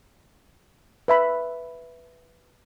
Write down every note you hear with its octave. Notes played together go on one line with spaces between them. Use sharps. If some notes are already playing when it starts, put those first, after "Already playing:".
B4 E5 B5